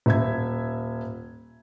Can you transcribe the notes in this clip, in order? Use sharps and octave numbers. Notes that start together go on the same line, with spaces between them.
D#1 E5 G#6